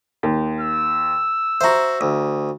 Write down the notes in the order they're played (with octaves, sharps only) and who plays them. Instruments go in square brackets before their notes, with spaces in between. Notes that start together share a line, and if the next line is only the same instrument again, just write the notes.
[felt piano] D#2
[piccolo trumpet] E6
[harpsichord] F#4 C5 [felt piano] E5 A#5
[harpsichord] D2